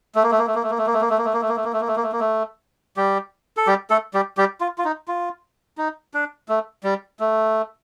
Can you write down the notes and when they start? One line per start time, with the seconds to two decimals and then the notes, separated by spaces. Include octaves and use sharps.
0.15 A3
0.23 A#3
0.31 A3
0.38 A#3
0.47 A3
0.55 A#3
0.63 A3
0.70 A#3
0.78 A3
0.86 A#3
0.94 A3
1.01 A#3
1.10 A3
1.18 A#3
1.25 A3
1.33 A#3
1.42 A3
1.48 A#3
1.56 A3
1.64 A#3
1.73 A3
1.80 A#3
1.88 A3
1.96 A#3
2.03 A3
2.12 A#3
2.20 A3
2.97 G3 G4
3.57 A4
3.67 G3 G4
3.90 A3 A4
4.14 G3 G4
4.37 G3 G4
4.61 F4
4.78 F4
4.85 D#4
5.08 F4
5.78 D#4
6.14 D4
6.49 A3
6.84 G3
7.20 A3